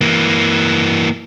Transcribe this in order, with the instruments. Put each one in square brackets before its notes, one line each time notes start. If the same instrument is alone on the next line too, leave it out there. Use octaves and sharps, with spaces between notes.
[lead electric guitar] E3 A#3